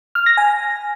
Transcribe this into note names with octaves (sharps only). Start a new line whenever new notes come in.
F6
A#6
G#5